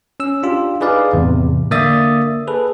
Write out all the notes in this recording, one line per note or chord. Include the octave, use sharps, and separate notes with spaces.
C#4 E6
D4 F4 G4
D#4 G#4 B4 D5 F5
E2 A2 C3
D3 A#3 D5 E5 D#6 A6
G#4 A4 B4